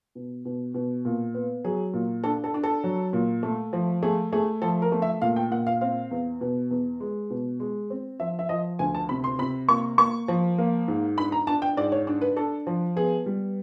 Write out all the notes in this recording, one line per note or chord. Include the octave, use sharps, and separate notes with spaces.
B2
B2
B2
A#2
B3
F#3 G#4
A#2
D4 A4
A4
D4
A4
F#3
A#2
A3
F3
A3 G#4
A3 G#4
F3 A4
A#4
A3
E5
A#2 F5
G5
A#2 F#5
F5
C4 F5
E2
B2
E2
G#3
B2
G#3
C4
F3 E5
E5
F3 D#5
D2 G#5
A5
C3 B5
C6
C3 B5
A#3 C#6
A#3 C#6
F3
A#3
G#2
D4 B5
A#5
D4 A5
G5
G#2 D5
C#5
D4
B4
D4 A4
F3
B3 G#4
G3